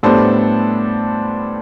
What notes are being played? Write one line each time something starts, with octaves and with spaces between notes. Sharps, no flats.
A2 G3 B3 D4 A4 C5